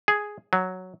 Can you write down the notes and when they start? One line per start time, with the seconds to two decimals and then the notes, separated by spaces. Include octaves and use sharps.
0.08 G#4
0.53 F#3